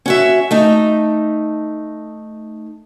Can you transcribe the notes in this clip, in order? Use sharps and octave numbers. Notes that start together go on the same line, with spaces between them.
C#4 F#4 E5
A3 D#4